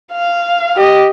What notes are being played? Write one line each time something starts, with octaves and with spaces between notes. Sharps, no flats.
F5
G4 D#5